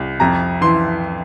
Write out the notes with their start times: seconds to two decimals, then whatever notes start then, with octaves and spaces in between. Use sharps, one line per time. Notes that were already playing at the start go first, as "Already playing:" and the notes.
Already playing: C2
0.20 F2 A#5
0.61 E3 C6